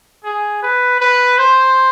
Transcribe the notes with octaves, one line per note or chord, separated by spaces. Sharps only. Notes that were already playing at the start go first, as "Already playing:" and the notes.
G#4
B4
B4
C5